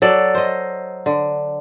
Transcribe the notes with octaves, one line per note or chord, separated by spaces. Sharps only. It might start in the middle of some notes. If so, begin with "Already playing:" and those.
F#3 A4 D5
C5 D#5
D3